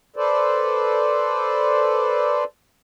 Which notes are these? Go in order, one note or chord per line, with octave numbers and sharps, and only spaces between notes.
A4 B4 C5 D5